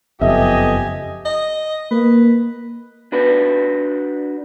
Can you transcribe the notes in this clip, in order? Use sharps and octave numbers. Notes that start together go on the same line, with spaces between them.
F#1 F2 B3 G4 A4 D#5 E5 G#5
D#5
A#3 B4
D4 F#4 B4